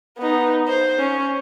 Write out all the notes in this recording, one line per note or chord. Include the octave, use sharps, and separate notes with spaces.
B3 D#4
C5
C#4